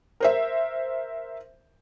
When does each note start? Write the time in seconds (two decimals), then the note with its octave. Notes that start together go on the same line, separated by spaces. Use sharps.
0.20 A#4 C5 E5